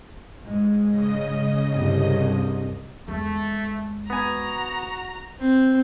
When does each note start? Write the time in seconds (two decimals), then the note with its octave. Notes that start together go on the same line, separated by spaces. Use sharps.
0.43 G#2 G#3
0.88 C#3 D#5
1.69 C2 G2
3.08 E2 G#3 A3
4.10 B3 F#4 G#5 A#5
5.40 C4